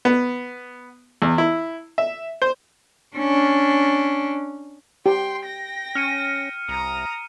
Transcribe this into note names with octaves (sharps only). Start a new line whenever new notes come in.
B3
E2
E4
E5
C5
C#4 D4
G4 G5 C6
G5 A#6
C#4 F6 C#7 D#7
C2 A#5 D#6